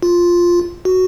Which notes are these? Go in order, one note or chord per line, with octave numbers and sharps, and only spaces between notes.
F4
F#4